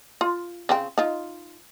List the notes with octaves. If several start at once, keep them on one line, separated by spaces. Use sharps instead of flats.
F4
C#3 C4 G5
D#4 F4